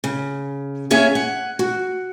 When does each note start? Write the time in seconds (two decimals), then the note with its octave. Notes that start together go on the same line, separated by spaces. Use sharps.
0.04 C#3
0.90 A#3 C#4 G#4 C#5 E5 G#5
1.15 F#5
1.59 F#4